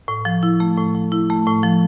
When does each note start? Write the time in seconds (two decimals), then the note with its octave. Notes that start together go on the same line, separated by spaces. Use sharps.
0.08 A2
0.25 F3
0.43 E4
0.60 A3
0.77 A2
0.95 F3
1.12 E4
1.30 A3
1.46 A2
1.63 F3